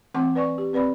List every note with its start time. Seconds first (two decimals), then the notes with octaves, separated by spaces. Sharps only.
0.14 E3 A3 C4 G#5 C6 D6
0.35 B4 D5 G#5 C#6
0.58 G4
0.73 C4 B4 D5 B5